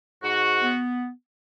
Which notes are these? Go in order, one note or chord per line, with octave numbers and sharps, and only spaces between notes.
G#2 F#4
B3